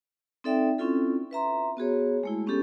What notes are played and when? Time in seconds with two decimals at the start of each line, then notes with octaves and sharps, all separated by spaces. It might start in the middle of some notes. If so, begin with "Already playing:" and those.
0.44 C4 D#4 A4 D5 E5 G5
0.78 C4 C#4 E4 F4 A4
1.31 B4 E5 A#5 C6
1.77 B3 F#4 G#4 C#5
2.23 G#3 A3 E4
2.46 B3 C#4 D4 G4 A4